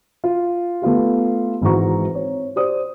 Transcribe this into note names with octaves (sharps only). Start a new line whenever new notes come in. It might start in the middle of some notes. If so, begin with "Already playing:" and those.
F4
A3 B3 F4 G4
G#1 G#2 E3 F#4 A#5 C#6
C4 C#5
G4 C5 D5 D#6